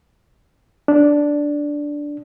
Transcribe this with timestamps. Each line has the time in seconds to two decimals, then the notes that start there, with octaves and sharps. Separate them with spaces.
0.88 D4